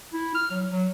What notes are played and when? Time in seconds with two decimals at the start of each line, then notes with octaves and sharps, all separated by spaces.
0.13 E4
0.35 F6
0.51 F#3
0.70 F#3